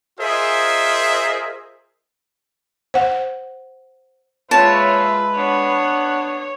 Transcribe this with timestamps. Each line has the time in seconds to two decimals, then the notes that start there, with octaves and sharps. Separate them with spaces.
0.20 F4 G#4 A#4 C5 D#5 E5
2.94 C5 F#5
4.51 A#2 G#3 F4 B4 C#5 E5 A5
5.36 B3 D4 C#5